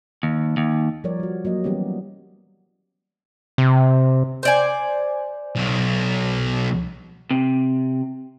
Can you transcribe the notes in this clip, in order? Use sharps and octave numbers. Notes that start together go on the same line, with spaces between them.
D#2
D#2
F3 G3 A#4 C#5 D5
G3 F#4
F#3 A#3 D#5
E3 G3 B3 C#4 G4
C3
C5 D5 G#5
B1
C3